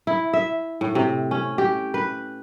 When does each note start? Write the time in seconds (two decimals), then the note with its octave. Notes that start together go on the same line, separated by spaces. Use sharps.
0.07 E4
0.33 E5
0.81 A2
0.95 C3
1.31 C#4
1.58 G4
1.94 B4